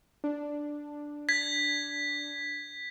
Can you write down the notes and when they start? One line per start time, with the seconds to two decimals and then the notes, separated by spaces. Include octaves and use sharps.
0.24 D4
1.29 G#6 B6